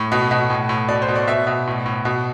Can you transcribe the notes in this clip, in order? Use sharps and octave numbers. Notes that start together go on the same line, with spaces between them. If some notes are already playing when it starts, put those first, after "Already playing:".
Already playing: A2
B2
B2
A2
A2
B2 D5
C5
B2
D5
B2 E5
B2
A2
A2
B2